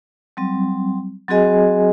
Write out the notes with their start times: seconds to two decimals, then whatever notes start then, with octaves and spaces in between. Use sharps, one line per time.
0.37 F#3 G3 C4
1.28 F#3 C4 F#4 G#4 D#5 G#5